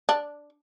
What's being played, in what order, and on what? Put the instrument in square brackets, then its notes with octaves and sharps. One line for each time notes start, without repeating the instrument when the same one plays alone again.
[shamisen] D4